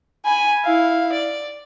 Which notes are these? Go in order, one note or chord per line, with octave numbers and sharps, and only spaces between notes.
G#5 B5
E4 F5
D5